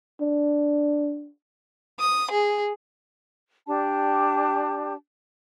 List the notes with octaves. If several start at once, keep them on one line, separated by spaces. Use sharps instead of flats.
D4
D#6
G#4
D4 G4 D5 A5